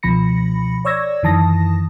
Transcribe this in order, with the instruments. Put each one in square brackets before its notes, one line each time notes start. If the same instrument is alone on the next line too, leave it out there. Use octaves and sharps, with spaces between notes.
[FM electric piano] C#2 B2 F3 B5 A#6 C#7
C#5 D5 C#6 E6 G#6 A#6
F#2 D#3 E3 A5 D#6 A#6